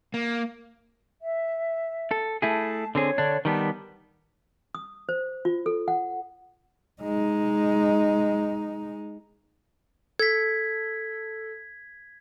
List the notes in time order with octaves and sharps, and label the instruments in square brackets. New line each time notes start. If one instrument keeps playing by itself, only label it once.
[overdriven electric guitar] A#3
[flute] E5
[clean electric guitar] A4
[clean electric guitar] A3 E4 G#4 [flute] A5
[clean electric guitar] D3 C4 G#4 [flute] C#5
[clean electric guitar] D3 D4
[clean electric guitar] D#3 G3 B3 [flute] A5
[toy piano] D#6
C5
F4
A4
F#5
[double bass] G#3 D#4
[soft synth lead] A4 [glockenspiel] G#6 B6